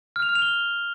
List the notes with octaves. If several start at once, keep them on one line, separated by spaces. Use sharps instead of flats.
F6
F7
F6
F7
G7